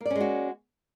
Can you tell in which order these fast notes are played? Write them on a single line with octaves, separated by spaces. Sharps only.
A#3 D5 C#4 G#3 F#4